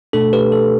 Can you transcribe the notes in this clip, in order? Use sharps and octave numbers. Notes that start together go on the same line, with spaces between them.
B2 A3 D4 A4
G4 B4
A4